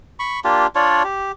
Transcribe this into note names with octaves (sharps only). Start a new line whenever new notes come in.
B5 C#6
A#3 D4 F4 G4
D4 F4 C#5 D5
G4